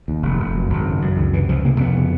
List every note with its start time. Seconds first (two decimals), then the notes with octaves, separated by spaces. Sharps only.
0.08 D#2
0.23 F1
0.39 F1
0.55 F#2
0.70 G#1
0.86 C#3
1.02 F#2
1.17 C#2 D#3
1.33 C3 E3
1.49 C#2 F3
1.64 C3 A#3
1.80 F2 B3
1.95 C#3